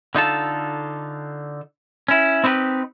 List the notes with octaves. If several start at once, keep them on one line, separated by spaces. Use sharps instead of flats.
D3 D#4 F4 A4
C#4 E4
C4 D#4 E4 G4 B4